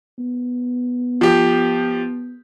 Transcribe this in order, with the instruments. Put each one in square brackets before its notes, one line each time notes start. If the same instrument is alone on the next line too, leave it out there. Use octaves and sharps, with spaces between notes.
[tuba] B3
[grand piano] F3 G4